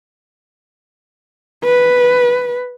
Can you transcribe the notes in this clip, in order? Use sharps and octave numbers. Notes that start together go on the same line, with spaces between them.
B4